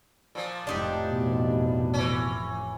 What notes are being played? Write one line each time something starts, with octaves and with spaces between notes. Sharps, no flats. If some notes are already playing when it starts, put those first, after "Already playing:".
A#2 F3
F1 A2 D4 D#4 G4
B2
E3 C#4